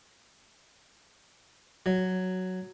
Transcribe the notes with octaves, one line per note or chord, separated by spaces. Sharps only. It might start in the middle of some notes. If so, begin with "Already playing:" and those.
F#3